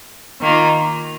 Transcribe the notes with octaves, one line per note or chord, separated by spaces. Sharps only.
D#3 A#3 F4